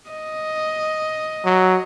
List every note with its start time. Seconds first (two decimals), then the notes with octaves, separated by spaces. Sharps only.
0.10 D#5
1.45 F#3